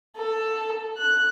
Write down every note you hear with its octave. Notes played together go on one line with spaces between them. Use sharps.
A4
F#6